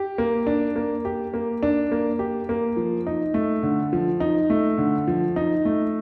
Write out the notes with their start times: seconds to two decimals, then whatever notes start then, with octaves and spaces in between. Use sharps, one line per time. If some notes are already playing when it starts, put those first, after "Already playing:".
Already playing: G4
0.18 A#3
0.47 D4
0.76 A#3
1.05 G4
1.34 A#3
1.63 D4
1.92 A#3
2.19 G4
2.49 A#3
2.77 F3
3.07 D#4
3.34 A3
3.63 D3
3.93 F3
4.20 D#4
4.50 A3
4.78 D3
5.08 F3
5.36 D#4
5.65 A3